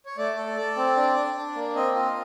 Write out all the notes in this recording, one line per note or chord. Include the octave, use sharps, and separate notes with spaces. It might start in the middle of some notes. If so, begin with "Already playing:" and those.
C#5
A3 D5
A4
A4
C4
D4
D4
D4
A#3
C4 D#5
F4